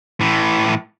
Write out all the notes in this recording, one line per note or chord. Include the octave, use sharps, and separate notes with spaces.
A2 E3